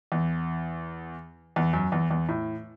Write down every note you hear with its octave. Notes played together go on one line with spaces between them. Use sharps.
E2
E2
F#2
E2
E2
A2